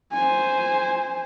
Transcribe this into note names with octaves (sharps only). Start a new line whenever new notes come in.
C5 G#5